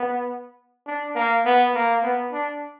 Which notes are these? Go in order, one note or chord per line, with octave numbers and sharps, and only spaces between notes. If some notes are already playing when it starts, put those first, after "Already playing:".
Already playing: B3
D4
A#3
B3
A#3
B3
D4